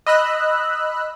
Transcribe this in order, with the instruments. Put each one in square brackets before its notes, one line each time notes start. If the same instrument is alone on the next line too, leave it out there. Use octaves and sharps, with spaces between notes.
[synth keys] D#5 B5 E6 F#6